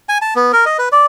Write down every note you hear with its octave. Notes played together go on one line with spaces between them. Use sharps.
G#5
A5
B3
A#4
D#5
B4
D5